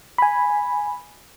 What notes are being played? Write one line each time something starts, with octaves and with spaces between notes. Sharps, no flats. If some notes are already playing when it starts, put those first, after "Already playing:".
G#5 B5